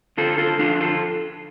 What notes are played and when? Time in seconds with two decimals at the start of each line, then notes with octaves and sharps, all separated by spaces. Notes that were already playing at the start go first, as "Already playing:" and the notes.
0.17 D3 F4 A4
0.38 F4 A4
0.59 F2 D4 F4
0.81 F4 A4